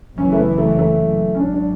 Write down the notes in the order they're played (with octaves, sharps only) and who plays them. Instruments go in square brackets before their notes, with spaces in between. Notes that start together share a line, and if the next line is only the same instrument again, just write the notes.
[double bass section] F#1 F#2 E3 [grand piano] C#4
[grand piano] A3
B3
A3
A3
C#4
[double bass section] G#1 G#2 F#3 [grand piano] D4
[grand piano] D4